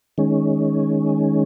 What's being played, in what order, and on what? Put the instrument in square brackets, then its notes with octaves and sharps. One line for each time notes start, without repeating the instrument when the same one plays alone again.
[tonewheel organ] D#3 G#3 C#4